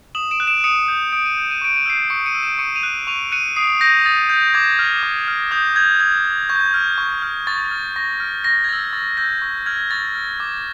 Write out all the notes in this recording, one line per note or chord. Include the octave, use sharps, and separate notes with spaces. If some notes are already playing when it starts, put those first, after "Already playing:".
D#6 E7 F#7
D7 E7
F#6
D7 E7
D#6 C#7 D#7
G6
D#6 D7
D#7
G6 D7
D#7
C#6 D7
D#7
E6 G6 C7 D7
C#6 C#7 D#7
C#7 D#7
E6 G6
D7 E7
C#6 C#7 D#7
D#7 F7
F#6
C#6 D#7 F7
F#6 C#7 D#7
D#6 C7 D7
G6 A#6
D#6 A6
G6
D6 G#6
F6
D6
F6
D#6 G6
G6 G#6
D#6 G#6
G6
C#6 G6
F6
C#6
F6
C#6 A6
F6
C#6 A#6
F6
C#6 A#6
G#6
E6 G6 A6
C#6 A6
E6 G6 A#6
C#6
F6 G#6
C#6 A6
F6
D6